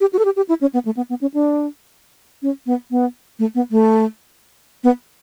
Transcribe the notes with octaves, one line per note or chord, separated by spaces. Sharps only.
G4
F#4
A4
G4
G4
E4
C#4
B3
A3
B3
B3
C#4
D4
C#4
B3
B3
A3
B3
A3
B3